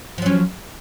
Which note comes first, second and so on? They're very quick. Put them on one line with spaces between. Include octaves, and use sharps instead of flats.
F3 F#3 C#4